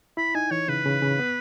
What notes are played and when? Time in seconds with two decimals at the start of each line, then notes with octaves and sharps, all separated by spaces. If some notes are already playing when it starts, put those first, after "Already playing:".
0.17 E4 B5
0.35 D#4 G#5
0.51 E3 C#5
0.68 C#3 B4
0.86 C#3
1.02 C#3
1.19 B3